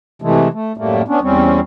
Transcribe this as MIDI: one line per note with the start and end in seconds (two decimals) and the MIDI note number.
0.22 0.48 48
0.22 0.48 52
0.22 0.48 56
0.22 0.48 57
0.53 0.72 57
0.77 1.02 42
0.77 1.02 45
0.77 1.02 55
0.77 1.02 57
0.77 1.02 58
1.08 1.20 59
1.08 1.20 61
1.08 1.20 62
1.22 1.60 40
1.22 1.60 55
1.22 1.60 60
1.22 1.60 61